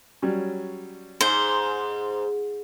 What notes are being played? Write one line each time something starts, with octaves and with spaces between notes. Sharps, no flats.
F#3 G3 C#4
G#2 C5